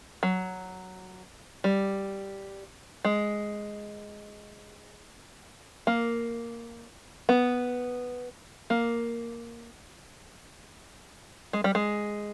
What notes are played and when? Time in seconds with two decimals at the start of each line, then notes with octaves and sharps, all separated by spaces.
0.23 F#3
1.64 G3
3.05 G#3
5.87 A#3
7.29 B3
8.70 A#3
11.53 G#3
11.64 G3
11.75 G#3